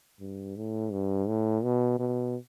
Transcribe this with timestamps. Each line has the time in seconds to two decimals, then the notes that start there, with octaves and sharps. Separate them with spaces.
0.21 G2
0.57 A2
0.92 G2
1.28 A2
1.64 B2
1.99 B2